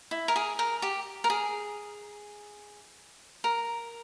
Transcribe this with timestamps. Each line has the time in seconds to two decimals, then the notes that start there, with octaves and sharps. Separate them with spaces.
0.11 E4
0.28 A#4
0.36 G#4
0.59 A#4
0.82 G4
1.24 A#4
1.30 G#4
3.44 A#4